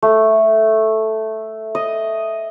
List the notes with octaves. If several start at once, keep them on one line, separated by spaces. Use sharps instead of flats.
A3
D#5